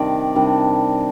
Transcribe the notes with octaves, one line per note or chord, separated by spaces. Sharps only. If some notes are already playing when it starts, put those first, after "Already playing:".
Already playing: C3 D#3 G3 D4 D5
C3 D#3 G3 D4